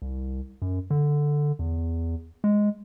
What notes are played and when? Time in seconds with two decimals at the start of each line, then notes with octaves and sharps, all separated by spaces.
0.02 C2
0.62 F#2
0.90 D3
1.59 E2
2.44 G#3